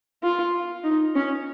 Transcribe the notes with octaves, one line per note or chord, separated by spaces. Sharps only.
F4
D#4
C#4